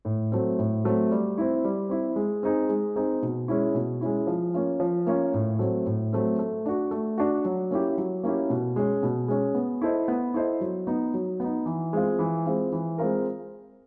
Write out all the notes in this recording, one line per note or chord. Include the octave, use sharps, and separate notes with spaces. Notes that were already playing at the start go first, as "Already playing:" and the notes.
A2
F#3 A3 C4
A2
F#3 A3 C4
G3
C4 E4
G3
C4 E4
G#3
C4 D#4 G#4
G#3
C4 D#4 G#4
B2
G#3 C#4 E4
B2
G#3 C#4 E4
F3
A#3 C#4 F4
F3
A#3 C#4 F4
A2
F#3 A3 C4
A2
F#3 A3 C4
A3
D4 F#4
A3
D4 F#4
F#3
A#3 C#4 E4 G4
F#3
A#3 C#4 E4 G4
B2
G#3 C#4
B2
G#3 C#4
B3
E4 A4 C5 D#5
B3
E4 A4 C5 D#5
F#3
B3 D#4
F#3
B3 D#4
E3
G#3 C4 F4
E3
G#3 C4 F4
E3
G#3 C4 F4 A#4